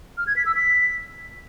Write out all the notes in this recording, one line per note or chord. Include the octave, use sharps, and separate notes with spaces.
F6
G#6
B6
E6
B6